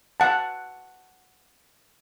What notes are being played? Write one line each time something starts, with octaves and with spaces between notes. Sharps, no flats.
F#5 A5